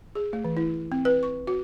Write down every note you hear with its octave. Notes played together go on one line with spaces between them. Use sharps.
G#4
A3
E3
E4
C4
B4
C#6
F#4